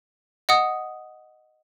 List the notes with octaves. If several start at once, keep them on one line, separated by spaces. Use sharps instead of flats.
D#5 F#5 D#6